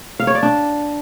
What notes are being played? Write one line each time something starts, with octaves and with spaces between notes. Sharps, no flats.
F5
C#5
D5
D4